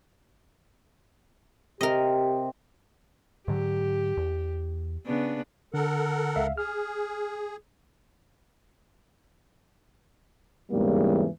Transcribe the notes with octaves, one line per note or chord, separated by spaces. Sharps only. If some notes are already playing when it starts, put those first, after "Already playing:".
C3 G4 A#4 D#5
G#2 D3 F#3 G4
E2
C#3 B3 D4
D3 A4 A#4 F#5
C#2 E5 F5
G#4 F6
E2 G#2 C#3 E3 G3 A#3